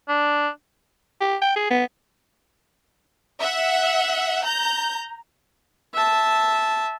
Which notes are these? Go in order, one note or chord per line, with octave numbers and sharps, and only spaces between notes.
D4
G4
G5
G#4
B3
E5 F#5
A#5 G6
E5 A5